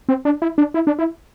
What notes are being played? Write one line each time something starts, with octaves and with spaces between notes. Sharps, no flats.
C4
D4
E4
D4
E4
D4
E4